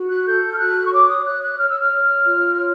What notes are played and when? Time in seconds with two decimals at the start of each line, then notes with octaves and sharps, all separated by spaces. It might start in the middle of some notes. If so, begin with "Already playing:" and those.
Already playing: F#4
0.09 F#6
0.26 A4 G6
0.52 F6
0.58 F#4 F#6
0.86 C#6
0.92 C#5 D6
1.09 D#6
1.25 C#5 F#6
1.42 F#6
1.58 C#5 F6
1.68 E6
1.79 F6
1.92 C#5
2.25 F4
2.58 C#5